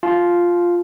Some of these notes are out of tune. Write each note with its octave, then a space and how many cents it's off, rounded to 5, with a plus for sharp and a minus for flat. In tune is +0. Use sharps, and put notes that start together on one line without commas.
F4 +0 A5 -35